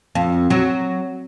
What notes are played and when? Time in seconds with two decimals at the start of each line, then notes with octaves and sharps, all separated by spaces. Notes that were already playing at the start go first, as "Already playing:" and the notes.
0.15 F2
0.50 F#3